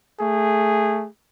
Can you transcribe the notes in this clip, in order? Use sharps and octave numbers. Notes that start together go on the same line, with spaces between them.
A3 G#4